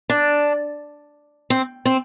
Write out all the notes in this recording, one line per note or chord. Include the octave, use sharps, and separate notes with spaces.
D4
C4
C4